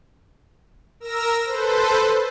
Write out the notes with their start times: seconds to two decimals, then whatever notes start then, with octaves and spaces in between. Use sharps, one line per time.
1.00 A#4 E6 A#6
1.44 A4 B4 C5